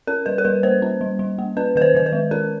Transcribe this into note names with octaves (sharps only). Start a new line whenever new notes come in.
C#4 A#4
G3 B4
A#4
G3 B4
A#3 C5
C#4
G3
G3
A#3
C#4 B4
D#3 B4
C5
D#3 C5
B4
G#3
C#4 A#4